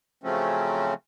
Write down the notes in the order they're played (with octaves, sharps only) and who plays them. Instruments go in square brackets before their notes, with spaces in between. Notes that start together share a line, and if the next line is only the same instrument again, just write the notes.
[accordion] C#3 F3 F#3 A3 C4 C#4